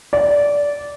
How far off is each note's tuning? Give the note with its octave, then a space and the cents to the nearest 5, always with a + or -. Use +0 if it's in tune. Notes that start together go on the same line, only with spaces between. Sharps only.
D5 -15